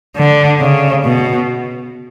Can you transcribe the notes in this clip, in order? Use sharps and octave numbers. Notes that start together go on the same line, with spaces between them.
D3
C#3
B2